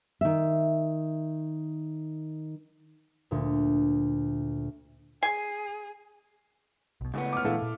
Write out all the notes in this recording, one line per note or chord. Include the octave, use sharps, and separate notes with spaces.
D#3 E5
D2 A#2
G#4 G#5 C7
B1 B2
C#2 A2 C#3 B3
D6 F6
A#2 E3 A3 E4 A4 F5
A#2